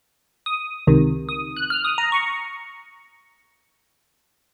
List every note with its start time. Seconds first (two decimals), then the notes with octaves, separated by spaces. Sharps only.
0.46 D#6
0.87 C#2 C3 D#3
1.29 D#6
1.57 F#6
1.70 F6
1.85 D#6
1.98 A#5
2.12 C#6